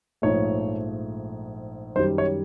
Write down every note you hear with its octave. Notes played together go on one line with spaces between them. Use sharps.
A#1 G#2 F3 A3 C#5
F#2 D#3 G3 C5
C#5